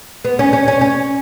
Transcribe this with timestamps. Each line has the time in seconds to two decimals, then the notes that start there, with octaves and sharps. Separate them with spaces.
0.25 B3
0.39 C#4
0.53 C#4
0.68 C#4
0.81 C#4